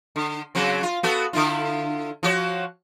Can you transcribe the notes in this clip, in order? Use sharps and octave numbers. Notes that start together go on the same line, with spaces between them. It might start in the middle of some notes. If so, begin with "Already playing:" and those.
D3
C#3 F#3 C4
F4
B3 F#4 A4
D3 E4 F4
F3 F#4 C#5